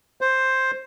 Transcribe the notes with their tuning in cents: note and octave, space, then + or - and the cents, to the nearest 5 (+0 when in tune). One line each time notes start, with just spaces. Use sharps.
C5 +5